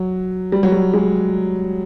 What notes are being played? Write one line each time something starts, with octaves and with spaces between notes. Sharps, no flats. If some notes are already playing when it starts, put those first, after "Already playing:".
Already playing: F#3
G3
F#3
G3
G#3